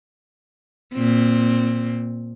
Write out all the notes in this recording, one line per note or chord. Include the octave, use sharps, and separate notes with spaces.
A#2 C4